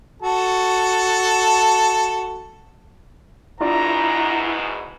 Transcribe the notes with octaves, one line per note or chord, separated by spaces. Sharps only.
F#4 A4 A5
E2 G#2 B2 D4 E4 F4 D5 A#5